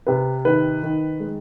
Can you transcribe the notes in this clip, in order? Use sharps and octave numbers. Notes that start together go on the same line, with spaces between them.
C3 B4
D#3 B4
D#3
G#3